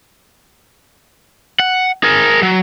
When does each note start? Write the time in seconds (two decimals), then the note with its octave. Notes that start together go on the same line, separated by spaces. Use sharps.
1.60 F#5
2.04 G#4 A#4
2.42 F#3